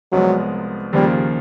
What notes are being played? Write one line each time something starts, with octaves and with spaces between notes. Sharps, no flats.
C2 C3 F3 F#3 G#3 B3
D#2 C#3 F3 G3 A#3